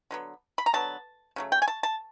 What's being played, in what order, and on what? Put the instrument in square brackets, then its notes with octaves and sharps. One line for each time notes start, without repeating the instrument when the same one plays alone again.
[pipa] D3 F#3 B3
B5
A#5
D3 F#3 B3 A5
C#3 F#3 A3
G5
G#5
A5
A5